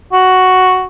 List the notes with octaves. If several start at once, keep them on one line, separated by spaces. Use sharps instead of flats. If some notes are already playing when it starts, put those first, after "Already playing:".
F#4